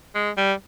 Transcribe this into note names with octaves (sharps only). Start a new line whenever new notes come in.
G#3
G3